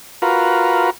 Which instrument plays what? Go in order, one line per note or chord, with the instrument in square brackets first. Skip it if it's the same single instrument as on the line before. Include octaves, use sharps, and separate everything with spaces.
[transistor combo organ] F4 F#4 A#4 B4